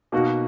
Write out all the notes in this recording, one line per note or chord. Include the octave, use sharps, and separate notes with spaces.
B2 A#3 D#4 F#4